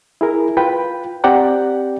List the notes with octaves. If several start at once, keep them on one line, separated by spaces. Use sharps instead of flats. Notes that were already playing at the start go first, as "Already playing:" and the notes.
E4 G#4 A#4
F4 B4 G5
C4 G4 D5 F#5 G5 A#5